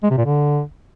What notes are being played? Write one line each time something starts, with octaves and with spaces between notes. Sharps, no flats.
G#3
C3
A#2
D3